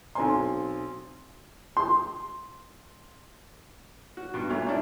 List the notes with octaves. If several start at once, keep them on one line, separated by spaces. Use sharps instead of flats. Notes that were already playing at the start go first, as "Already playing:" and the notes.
B1 C4 G#5 C6
C6
F#4
G2 B2
F#2 A#2 F#3 A3
C#4 D4 E4